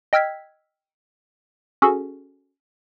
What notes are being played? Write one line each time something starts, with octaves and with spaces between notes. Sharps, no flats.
D#5 G5 E6 F6 G#6 B6
C#4 F#4 G#4 A4